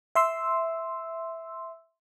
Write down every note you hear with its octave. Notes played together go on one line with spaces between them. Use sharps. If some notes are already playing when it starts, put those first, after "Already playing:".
E5 C6 E6